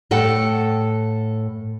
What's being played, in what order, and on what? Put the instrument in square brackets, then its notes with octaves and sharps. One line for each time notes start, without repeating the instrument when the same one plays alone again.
[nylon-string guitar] A2 A4 F#5 G5